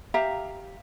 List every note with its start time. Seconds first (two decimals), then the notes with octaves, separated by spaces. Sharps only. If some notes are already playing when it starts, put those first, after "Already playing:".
0.14 G4 E5 F5 A#5